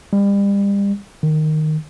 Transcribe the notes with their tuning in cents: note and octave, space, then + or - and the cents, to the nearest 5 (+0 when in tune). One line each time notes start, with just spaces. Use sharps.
G3 +35
D#3 -10